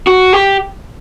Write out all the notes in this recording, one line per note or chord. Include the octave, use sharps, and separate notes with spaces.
F#4
G4